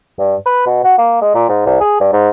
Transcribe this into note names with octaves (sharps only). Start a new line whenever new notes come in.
G2
B4
B2
F#4
A#3
G#3
A#2
G#2
C2
G#4
G2
G#2